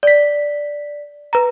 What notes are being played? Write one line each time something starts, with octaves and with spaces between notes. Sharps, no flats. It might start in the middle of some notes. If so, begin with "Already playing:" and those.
D5 B6
B4 A#5